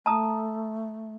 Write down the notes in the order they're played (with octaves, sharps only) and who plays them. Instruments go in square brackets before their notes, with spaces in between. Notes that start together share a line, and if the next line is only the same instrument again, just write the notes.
[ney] A3 [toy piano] A5 A#5 D#6